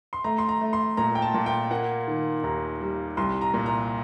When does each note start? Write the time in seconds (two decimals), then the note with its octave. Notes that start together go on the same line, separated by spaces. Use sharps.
0.13 C6
0.24 A3 A#5
0.38 C6
0.49 A#5
0.61 A3
0.73 C6
0.97 A#2 A#5
1.15 G5
1.22 A5
1.34 A#2
1.46 G5
1.71 A#3 F#5
2.08 D#3
2.44 D#2 A#5
2.81 G3
3.17 C2 C6
3.41 A#5
3.54 A#2
3.66 A#5